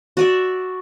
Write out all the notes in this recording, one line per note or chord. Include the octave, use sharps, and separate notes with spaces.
F#4 D5 E5